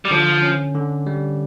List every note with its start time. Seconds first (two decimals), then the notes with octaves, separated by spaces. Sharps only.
0.05 G3
0.11 D3 F3
0.42 C#4
0.75 D3
1.06 G3